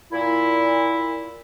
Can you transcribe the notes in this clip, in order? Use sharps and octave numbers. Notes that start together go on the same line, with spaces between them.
A#2 E4